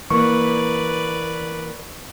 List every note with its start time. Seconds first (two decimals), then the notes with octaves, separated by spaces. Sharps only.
0.10 E3 A#3 B4 D5 C#6